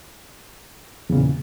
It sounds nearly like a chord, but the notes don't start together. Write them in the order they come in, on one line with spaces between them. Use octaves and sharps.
E2 C#3 A#2